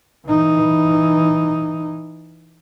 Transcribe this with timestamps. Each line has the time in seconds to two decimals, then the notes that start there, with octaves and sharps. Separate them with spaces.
0.27 E3 D#4